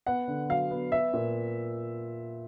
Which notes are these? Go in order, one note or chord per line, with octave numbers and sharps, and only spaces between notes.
B3 F#5
D3
F#3 F5
B3
B3 E5
A#2